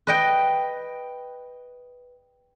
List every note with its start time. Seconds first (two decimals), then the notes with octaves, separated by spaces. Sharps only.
0.07 B4 D#5 G5